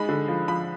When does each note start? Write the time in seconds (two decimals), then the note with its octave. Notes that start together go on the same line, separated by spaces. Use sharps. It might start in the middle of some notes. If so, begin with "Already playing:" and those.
Already playing: G#3 D#4 B5
0.09 D3
0.28 F3
0.48 F3 B5